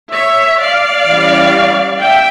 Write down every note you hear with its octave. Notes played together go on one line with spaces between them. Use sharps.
C#5 E5
D5 F5
E3 G3 C#4
E5 G5